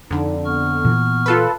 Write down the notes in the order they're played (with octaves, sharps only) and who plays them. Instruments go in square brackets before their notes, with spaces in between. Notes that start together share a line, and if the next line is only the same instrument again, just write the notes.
[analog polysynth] F2 D3 [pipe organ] D#4
[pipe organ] B3 C#6 F6
[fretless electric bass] A#2 E3
[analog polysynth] F4 A4 B4